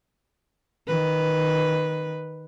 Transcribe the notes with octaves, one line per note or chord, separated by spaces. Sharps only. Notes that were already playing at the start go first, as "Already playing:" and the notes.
D#3 B4